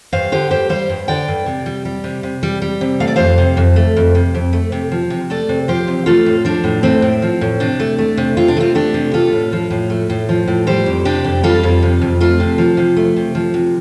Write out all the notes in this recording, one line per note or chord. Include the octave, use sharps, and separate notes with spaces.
G2 C5 F5
D3 G4 C5
G2 G4 C5
G3 C5 F5
G2
D3 D5 G5
G2
C3
G3
G3
C3
C3
G3
G3
C3
A3 F5
D5
F2 C5 F5
C3
F2
A3
F2
C3
F2
A3
C3
F3
C3
A3 A4 D5
C3
F3 G4 C5
C3
A3 F4 A4
A2
F3 D4
A2
A3 C4
A2
F3
A2
C3 D4
A3
A3
C3
C3 F4
D4
A3 C4 F4
A3 D4 G4
C3
A3 F4 A4
A2
F3
A2
A3
A2
F3
A2
G3 G4 C5
F2
C3 D4 G4
F2
G3 F4 A4
F2
C3
F2
A3 F4 A4
C3
F3
C3
A3
C3
F3
C3